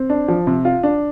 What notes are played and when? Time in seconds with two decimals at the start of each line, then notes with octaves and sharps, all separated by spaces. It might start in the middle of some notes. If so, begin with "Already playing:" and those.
Already playing: C4
0.10 D4
0.28 F3
0.47 C3
0.65 F4
0.83 D4